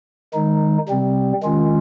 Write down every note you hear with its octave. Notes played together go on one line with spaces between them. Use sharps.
D#3 G#3 D#4
C3 G3 C4
D#3 G#3 C#4 F4